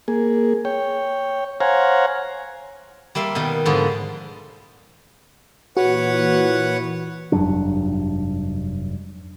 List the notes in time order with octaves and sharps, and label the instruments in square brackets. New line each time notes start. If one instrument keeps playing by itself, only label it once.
[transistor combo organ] A#3 G#4
C#5 G5
C5 C#5 F5 F#5 G#5 A#5
[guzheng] G3 A#3 E5 C6
B2 D#3 G3
G#2 D3 F3 B3
[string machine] A#2 E3 [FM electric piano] F#4 [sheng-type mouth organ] B4 C#5 F#5
[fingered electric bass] F1 G2 F#3 D4